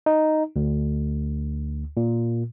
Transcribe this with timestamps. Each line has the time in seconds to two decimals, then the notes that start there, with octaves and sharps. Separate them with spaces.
0.06 D#4
0.56 D2
1.97 A#2